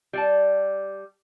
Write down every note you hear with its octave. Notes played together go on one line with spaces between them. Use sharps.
G3 D5 A5